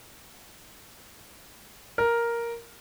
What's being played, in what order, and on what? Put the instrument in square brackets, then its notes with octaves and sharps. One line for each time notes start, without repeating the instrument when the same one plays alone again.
[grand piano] A#4